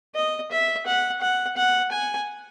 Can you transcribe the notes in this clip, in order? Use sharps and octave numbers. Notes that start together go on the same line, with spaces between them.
D#5
E5
F#5
F#5
F#5
G#5